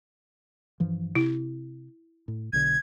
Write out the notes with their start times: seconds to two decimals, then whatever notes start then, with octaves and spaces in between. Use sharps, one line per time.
0.80 G2 E3 F3
1.15 C3 E4
2.28 A2
2.53 B1 B2 D3 G#6